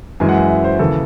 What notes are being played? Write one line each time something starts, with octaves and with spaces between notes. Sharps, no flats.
F#2 E3 G#3 G#5
F#5
E5
E5
C5
D#2 C#3 E3 A4